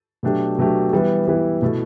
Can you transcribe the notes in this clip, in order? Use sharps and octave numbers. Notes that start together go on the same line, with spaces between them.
B2 F#3 A3 D4 G4
B2 F#3 A3 D4 G4
E3 G3 B3 E4 B4
E3 G3 B3 E4 B4
B2 A3 E4 A4